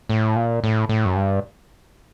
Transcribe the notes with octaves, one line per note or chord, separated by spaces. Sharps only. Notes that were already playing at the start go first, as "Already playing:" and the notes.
A2
A#2
A2
A2
F#2
G2